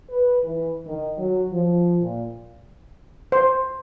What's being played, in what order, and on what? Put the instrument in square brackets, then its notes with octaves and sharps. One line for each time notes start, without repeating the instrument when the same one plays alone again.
[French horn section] B4
E3
D#3
F#3
F3
A#2
[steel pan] C5